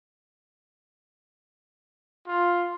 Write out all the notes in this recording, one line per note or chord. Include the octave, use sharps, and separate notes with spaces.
F4